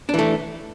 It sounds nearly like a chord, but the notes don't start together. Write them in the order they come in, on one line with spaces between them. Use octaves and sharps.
D4 E3 A3